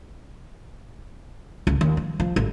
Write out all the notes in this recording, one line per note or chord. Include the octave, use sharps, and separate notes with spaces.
C#2
D#2
F3
F3
A1